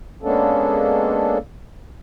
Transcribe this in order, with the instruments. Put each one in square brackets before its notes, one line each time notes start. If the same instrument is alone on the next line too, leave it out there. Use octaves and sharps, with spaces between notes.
[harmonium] G#3 A#3 B3 C#4 D4 A4